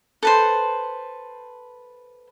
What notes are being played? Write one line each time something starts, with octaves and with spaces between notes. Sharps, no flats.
A4 B4 C5